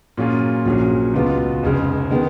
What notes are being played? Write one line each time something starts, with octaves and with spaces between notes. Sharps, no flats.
A#2 F#3 C#4 F4 G#4
A#1 A#2 F#3 C#4 G#4
C#2 B2 G#3 B3 F4
F1 F2 C#3 G#3
D#3 G#3 B3